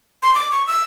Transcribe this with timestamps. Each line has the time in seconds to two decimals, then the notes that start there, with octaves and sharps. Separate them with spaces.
0.23 C6
0.35 D6
0.52 C#6
0.67 E6